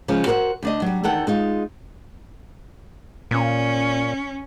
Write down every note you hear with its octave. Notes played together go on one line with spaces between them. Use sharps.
C#3 F3 G#3 C#4
F#4 A#4 C5 D#5 F#5
D2 D4 D#5
F#3 G3
E2 D#3 A4 F#5 G5
G#3 D#4 F4
A#2 C#4